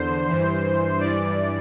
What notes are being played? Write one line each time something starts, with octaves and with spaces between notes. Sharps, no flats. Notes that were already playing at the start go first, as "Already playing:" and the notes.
Already playing: E2 D3 C5
G2 E3
G2 E3 D5